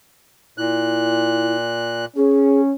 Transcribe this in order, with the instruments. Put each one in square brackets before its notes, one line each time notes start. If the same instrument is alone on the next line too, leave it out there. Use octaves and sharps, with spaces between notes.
[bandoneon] A#2 F#6 [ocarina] E4
[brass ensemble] C#4 [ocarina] G#4